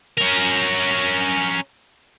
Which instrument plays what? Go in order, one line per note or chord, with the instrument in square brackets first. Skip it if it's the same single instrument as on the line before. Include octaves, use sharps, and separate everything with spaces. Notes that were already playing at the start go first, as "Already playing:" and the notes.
[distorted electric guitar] C#4 A#4